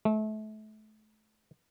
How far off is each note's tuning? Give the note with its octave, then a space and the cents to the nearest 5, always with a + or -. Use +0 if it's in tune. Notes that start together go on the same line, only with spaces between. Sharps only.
A3 -30